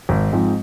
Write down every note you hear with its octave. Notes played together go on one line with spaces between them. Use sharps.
G#1
G#2 F3 G#3 C4